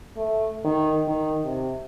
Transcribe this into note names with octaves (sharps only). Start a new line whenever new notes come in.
A3
D#3
D#3
C3